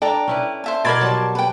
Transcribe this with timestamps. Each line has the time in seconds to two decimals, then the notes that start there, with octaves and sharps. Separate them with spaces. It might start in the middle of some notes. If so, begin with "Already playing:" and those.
0.02 D4 A4 D5 G5 A#5
0.28 C#4 E4 B4
0.64 C5 E5 A5
0.85 B2 A#4 D5 B5 C6 D6 G#6 A6
1.01 F#3 G3 A5
1.35 B4 G5